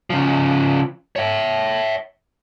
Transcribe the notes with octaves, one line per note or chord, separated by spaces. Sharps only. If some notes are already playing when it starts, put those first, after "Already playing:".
C#3 F3
C#5 E5